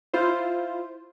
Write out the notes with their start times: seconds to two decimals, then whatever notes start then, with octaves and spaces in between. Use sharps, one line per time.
0.14 E4 F4 C5